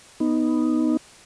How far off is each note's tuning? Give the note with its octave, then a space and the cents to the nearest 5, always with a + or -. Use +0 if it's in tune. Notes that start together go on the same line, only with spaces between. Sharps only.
B3 +0 D#4 +0